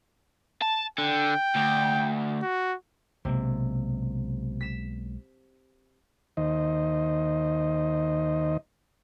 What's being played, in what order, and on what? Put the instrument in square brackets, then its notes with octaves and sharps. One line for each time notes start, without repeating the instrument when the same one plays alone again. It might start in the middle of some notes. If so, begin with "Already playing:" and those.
[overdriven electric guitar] A5
[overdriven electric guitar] D3 [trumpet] G5
[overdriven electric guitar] D2
[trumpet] F#4
[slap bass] B1 G#3 A#3 [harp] C3
[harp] B6 E7
[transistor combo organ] D#2 D#3 C5 D#5